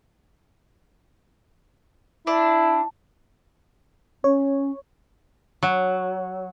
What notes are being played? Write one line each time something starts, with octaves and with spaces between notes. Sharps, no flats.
D4 E4
C#4 C#5
F#3